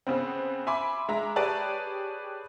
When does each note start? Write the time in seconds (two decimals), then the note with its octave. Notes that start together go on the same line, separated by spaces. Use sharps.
0.07 C#3 B3 C4
0.67 E5 G#5 B5 C6 D6
1.09 G#3 E5 A#5
1.36 G4 G#4 B4 C#5 D5 A5